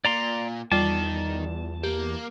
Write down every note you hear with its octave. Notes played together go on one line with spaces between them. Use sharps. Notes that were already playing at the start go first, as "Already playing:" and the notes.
A#2 D5 A#5 C6
E2 D#3 G3 F4 D5 A5
A#3 G4